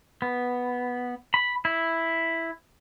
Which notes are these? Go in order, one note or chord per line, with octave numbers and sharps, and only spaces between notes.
B3
B5
E4